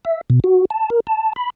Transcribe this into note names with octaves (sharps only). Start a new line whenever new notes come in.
E5
B2
F#4
A5
A#4
A5
B5